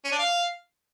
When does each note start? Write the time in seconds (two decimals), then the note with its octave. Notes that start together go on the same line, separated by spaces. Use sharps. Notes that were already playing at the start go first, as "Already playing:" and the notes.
0.05 C#4
0.11 D4
0.18 F5